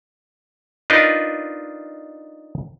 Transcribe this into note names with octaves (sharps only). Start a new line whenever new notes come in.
D4 D#4 F4 A#4 B4 D#5